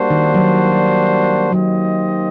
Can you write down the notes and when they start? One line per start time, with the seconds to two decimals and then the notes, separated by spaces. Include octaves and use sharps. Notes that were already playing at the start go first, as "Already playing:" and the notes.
Already playing: G3 A#3 D4 F#4 C5
0.10 D#3
0.35 F#3
1.52 F#3 A#3 D#4 G4 C5 D#5